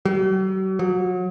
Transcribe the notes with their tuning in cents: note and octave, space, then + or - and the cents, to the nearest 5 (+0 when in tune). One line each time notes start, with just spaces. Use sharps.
F#3 +45
F#3 -30